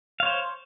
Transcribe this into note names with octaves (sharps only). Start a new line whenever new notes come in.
C5 C#5 F5